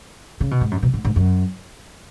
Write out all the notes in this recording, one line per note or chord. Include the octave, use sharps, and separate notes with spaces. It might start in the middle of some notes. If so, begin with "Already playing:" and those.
C#3
B2
G#2
F#2
B2
G#2
G#2
F#2